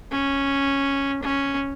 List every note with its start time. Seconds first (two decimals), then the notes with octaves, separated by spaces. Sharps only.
0.12 C#4
1.23 C#4